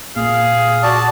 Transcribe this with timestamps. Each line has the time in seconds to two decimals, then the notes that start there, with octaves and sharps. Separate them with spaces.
0.16 A#2 G#4 F5
0.83 F#4 D5 A5